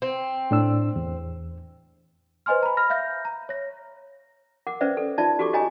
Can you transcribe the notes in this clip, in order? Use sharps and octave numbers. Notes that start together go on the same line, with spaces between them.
C4
A2 D4 E6
E2
B4 C5 D#5 G#5 C6 F6
A#5 B5
B5 F6 A#6
E5 F5 G6 A#6
A#5
C#5 A#6
A#4 F#5 D6
C#4 B4 C5 D5 E5
A4
D#4 F4 D5 E5 A5
F#4 G4 A4 C#6 D6
F#4 C#5 D#5 G#5 A#5 D#6